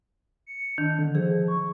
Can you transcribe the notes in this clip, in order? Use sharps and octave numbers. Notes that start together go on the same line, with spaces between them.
C#7
D#3 D4
D3
F3 G#4
C#6